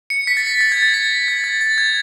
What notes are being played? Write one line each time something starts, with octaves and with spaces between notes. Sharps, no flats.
C#7
B6
A6
B6
A6
G#6
A6
B6
A6
A6
A6
G#6